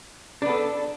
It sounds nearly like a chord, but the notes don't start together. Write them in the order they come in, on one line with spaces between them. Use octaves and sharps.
D4 B3 A4